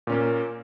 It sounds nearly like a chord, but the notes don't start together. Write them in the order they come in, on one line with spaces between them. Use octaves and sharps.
A#2 C#4 A#3